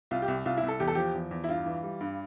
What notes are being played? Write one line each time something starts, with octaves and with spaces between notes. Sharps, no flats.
C2 F4
G4
C2
C2 F4
E4
C2
A4
E2 G4
A4
F3 G4
E2
E2
E4
G2 F4
E3
G3
G2